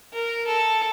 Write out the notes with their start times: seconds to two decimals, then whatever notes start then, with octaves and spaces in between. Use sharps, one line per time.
0.13 A#4
0.47 A4